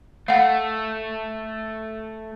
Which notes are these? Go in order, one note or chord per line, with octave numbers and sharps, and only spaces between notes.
A3 F5 F#5